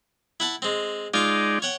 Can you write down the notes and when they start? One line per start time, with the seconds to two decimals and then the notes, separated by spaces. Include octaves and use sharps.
0.40 E4 F#5 A5
0.62 G#3 C4
1.14 G#3 D#4 F4 D5 C#6 D6
1.62 C#5 F#5 G5